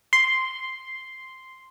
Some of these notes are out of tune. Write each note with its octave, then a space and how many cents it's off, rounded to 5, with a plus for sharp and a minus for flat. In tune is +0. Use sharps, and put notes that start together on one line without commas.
C6 -5